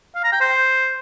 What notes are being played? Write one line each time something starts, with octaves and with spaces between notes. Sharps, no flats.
F5
A#5
G5
C5